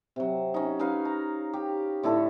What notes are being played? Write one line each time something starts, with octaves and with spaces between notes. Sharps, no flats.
C3 F#3
C#4 D#4
C#4 D#4 B4 F5
A#5
G4
A2 D3 E4 A4